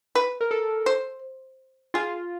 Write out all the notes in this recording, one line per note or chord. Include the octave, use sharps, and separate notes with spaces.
B4
A#4
A4
C5
F4 G#4